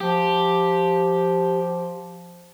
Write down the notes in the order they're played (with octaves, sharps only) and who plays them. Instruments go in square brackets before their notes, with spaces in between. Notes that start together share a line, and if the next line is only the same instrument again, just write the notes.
[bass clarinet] F3 [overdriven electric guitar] G4